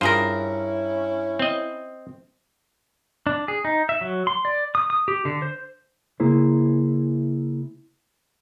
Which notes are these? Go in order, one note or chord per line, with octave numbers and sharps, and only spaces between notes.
G2 C#4 E4 F4 G#4 A#4 C5
C4 D#5
D4
G#4
D#4
E5
F#3
C6
D5
D#6
D#6
G4
D3
C5
C#3 A#3 E4 G#4 C5